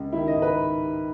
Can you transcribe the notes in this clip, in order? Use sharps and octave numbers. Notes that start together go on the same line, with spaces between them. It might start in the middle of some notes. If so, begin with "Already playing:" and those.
Already playing: C#2
D#3 E4
D#5
G#2
B4